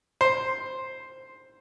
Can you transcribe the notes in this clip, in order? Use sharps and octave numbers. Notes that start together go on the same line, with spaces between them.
C5